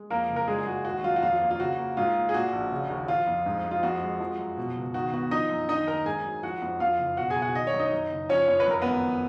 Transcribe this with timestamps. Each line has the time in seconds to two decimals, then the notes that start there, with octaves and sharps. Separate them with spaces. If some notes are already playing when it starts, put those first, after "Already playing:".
Already playing: G#3
0.10 F2 A#3 A#4
0.30 F#1
0.36 A#4
0.48 A#2 G#3 G#4
0.58 G#4
0.66 G#3 F#4
0.85 D#2 F#4
1.03 F#3 F4
1.16 F#4
1.22 F2 F4
1.41 A#3
1.51 F4
1.60 C#3 F#4
1.78 A#3
1.97 G#2 F4
2.15 A#3
2.29 G#4
2.34 A#2 F#4
2.53 A#1
2.72 C#3
2.89 D#2
3.08 F3 F4
3.27 F2
3.46 G#2
3.64 G#3
3.71 F4
3.83 F2 F#4
4.01 G#3
4.20 F3
4.39 F#2
4.57 B2
4.76 C#2
4.94 D#3 F#4
5.13 B3 F#4
5.31 F3 D#4 D#5
5.50 F#2
5.69 D#3 D#4 D#5
5.87 D#2 A#4 A#5
6.06 G#2 G#4 G#5
6.25 F#3
6.43 F3 F#4 F#5
6.62 F2
6.80 F2 F4 F5
6.99 F#1
7.17 B2 F#4 F#5
7.30 G#4 G#5
7.36 B1
7.42 F#4 F#5
7.55 D#3 D#5
7.67 C#5
7.74 F#2
7.79 D#4 D#5
7.92 F#2
8.11 F#1
8.29 F3 C#4 C#5
8.48 F2 C#5
8.60 B4
8.66 F#2 A#4
8.82 G#1 B3 B4